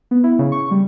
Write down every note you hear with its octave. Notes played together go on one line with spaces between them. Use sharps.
B3
E4
C#3
C#6
G3